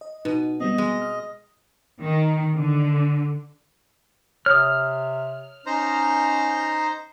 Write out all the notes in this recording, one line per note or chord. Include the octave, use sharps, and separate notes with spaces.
D#5
B2 D#4
G3 B3 C4 D#5
G#3
F6
D#3
D3
C3 C#5 D#6 F6
C#4 D#4 C5 A#5